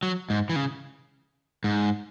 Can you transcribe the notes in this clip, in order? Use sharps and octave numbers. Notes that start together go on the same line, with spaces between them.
F#3
G#2
E3
C#3
G#2